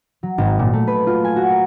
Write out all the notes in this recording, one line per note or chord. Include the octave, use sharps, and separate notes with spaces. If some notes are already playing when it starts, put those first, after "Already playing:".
F#3
G#1
A#2
A3
B4
F4
G#5
F#4
A#4